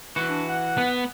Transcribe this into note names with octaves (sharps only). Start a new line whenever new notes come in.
E3 F#4
D4
F#5
B3